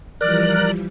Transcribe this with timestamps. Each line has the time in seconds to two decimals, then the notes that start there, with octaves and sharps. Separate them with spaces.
0.21 E3 F3 G3 A#4 D5 F#6